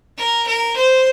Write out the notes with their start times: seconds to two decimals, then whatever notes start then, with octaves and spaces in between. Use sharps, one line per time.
0.18 A#4
0.47 A#4
0.77 C5